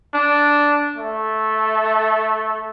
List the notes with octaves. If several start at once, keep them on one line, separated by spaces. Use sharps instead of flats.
D4
A3